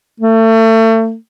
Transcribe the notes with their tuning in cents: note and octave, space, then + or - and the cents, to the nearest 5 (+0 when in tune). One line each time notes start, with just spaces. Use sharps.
A3 +30